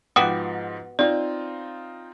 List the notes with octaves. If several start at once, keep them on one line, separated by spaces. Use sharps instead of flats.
G#2 F3 B3 F#4 G4 D#6
C4 D#4 F4 D5